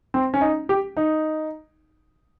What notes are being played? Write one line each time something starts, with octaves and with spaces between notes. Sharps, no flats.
C4
C#4
D#4
G4
D#4